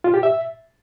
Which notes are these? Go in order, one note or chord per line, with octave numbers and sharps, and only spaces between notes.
F4
G4
E5